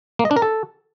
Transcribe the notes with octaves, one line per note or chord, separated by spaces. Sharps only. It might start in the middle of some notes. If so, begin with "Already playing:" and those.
A#3
D#5
D4
A#4
A4